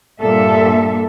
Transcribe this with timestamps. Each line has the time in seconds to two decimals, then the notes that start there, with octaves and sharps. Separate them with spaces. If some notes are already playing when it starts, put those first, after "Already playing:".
0.21 G2 A#2 G3 A#3 A4 E5